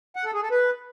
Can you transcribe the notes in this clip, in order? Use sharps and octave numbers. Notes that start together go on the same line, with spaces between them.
F#5
A4
G#4
A4
B4